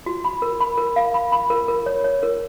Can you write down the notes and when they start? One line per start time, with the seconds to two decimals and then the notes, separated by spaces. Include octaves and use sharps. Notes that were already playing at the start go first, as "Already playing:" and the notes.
0.06 F#4
0.24 B5
0.42 A#4
0.60 B5
0.78 A#4
0.96 F5
1.14 B5
1.32 B5
1.50 A#4
1.68 A#4
1.86 C#5
2.04 C#5
2.23 A#4